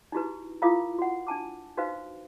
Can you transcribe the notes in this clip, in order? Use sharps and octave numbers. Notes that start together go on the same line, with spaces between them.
D#4 E4 F#4 G4 B4
E4 F4 A#4 F5 D6 D#6
F#4 F#5
D4 G#5 A5 D6
D#4 F#4 B4 C5 F5